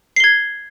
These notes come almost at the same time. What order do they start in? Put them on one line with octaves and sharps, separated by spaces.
C7 G7 G#6